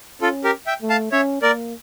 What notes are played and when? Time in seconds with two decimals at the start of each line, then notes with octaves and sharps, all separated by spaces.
0.21 C#4 F4 A4
0.44 G4 A#4
0.67 E5 G5
0.82 A3
0.90 F5 A5
1.12 C#4 C#5 E5
1.42 A#3 A#4 D5